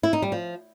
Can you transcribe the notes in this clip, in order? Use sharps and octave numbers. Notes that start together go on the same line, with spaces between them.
E4
D#4
G3
F3